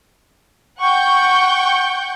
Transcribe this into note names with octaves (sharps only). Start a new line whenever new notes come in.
F#5 G5 C#6 G6